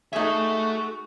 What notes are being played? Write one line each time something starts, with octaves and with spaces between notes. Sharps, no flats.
D#4 F#4 G#4 A4 E5